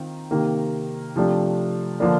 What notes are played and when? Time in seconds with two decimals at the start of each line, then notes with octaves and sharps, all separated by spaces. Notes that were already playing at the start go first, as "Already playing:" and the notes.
Already playing: D#3 C4 F4
0.31 C3 D#3 A#3
1.16 C3 F3 A3 D4
2.00 D3 F3 A#3 D4